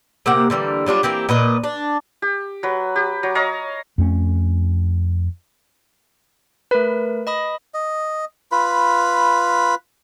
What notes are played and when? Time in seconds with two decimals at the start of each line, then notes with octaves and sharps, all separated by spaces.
0.26 C3 A#3 G4 F#5
0.50 D3 E3 G3 A#3
0.86 F#3 G3 D4 F4
1.03 E3 A#3 C4 G4
1.29 A#2 B4 D#5
1.64 D4
2.22 G4
2.63 F#3 B4
2.96 G4
3.23 F#3
3.35 C#5 D#5 F5 A#5
3.98 F2 A3 C#4
6.71 A3 A#4 B4
7.27 D#5 B5 D#6
7.74 D#5
8.52 F4 B4 B5